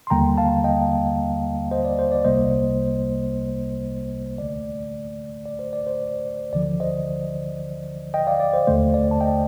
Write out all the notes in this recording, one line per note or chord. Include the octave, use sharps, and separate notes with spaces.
C6
D#2 D3 G3 A#3 G5 A#5
F5 A5
D#5 G5
C5 D#5
D5
C5
D5
C2 C3 G3 A#3 C5 D#5
D2 D3 A3 D5
D5
C5
D5
C5
D2 D3 F3 D5
C5 D#5
D#5 G5
D5 F5
D5
C5
D#2 D3 A3 C5
D5
A5
D#5 G5